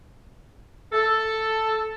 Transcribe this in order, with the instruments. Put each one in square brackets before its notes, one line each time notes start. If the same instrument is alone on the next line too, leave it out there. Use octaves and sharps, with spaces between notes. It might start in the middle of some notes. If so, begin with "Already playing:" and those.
[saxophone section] A4